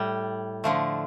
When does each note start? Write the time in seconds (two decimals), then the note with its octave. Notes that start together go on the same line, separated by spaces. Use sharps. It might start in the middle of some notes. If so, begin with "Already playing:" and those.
Already playing: A2 G3
0.64 D3 F3 A3